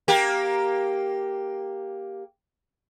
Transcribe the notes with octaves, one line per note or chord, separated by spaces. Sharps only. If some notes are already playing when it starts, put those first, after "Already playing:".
A#3 G4